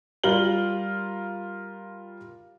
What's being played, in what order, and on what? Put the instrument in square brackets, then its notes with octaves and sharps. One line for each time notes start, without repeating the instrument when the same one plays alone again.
[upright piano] G3 F4 A#4 F#7 G7